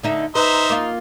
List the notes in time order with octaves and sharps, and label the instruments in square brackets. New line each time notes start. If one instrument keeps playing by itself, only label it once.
[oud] D3 D#4 E5
[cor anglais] D#4 [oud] B4 [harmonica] C5 E5 A#5
[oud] A#3 F4